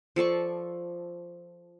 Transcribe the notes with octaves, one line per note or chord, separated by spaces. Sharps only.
F3 A4 D5 C#6